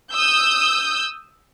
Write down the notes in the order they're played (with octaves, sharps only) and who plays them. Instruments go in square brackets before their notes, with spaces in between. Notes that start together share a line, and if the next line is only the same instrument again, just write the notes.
[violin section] D#6 E6 G6